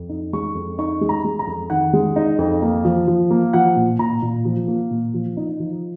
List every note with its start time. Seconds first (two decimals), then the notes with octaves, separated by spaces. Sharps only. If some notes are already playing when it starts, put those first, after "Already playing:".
Already playing: F2
0.09 D#4
0.33 G#3 C#6
0.55 F2
0.78 D#4 C#6
1.01 G#3
1.09 A#5
1.24 G#3
1.39 A#5
1.47 F2
1.70 D#3 F#5
1.93 G#3
2.16 D#4
2.39 F2
2.62 A#3
2.85 F3
3.07 F3
3.30 A#3
3.53 F3 F#5
3.76 A#2
3.99 A#2 A#5
4.22 A#2
4.45 F3
4.68 A#3
4.91 A#2
5.14 F3
5.37 D#4
5.60 F3